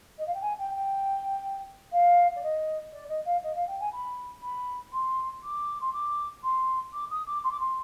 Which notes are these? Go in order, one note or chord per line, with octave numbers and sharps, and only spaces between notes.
D#5
F5
G5
G#5
G5
G5
F5
D5
D#5
D5
D#5
F5
D#5
F5
G5
G#5
B5
B5
C6
D6
C6
D6
C6
D6
D#6
D6
C6
D6
C6